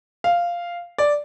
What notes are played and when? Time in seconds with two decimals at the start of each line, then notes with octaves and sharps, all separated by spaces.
0.24 F5
0.98 D5